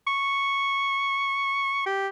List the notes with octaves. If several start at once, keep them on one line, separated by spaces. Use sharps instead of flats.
C#6
G4